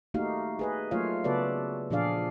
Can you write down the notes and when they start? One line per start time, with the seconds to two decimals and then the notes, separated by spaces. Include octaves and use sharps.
0.14 A3 A#3 D#4 F#4 G4 F5
0.59 G#4 B4 D#5
0.91 F#3 A3 A#3 F4 C#5 F5
1.24 C#3 B3 F#4 A4 B4 D5
1.91 A#2 F3 D4 G#4 D5 F5